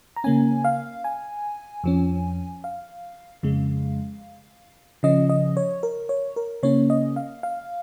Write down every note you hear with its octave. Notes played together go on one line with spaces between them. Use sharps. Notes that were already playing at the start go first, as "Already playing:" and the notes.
A#5
C#3 A#3 C#4 G#5
F5
G#5
F2 F3 C#4
F5
F2 C#3 G#3
C#3 F3 C#4 D#5
D#5
C#5
A#4
C#5
A#4
C#3 A#3 C#4 C#5
D#5
F5
F5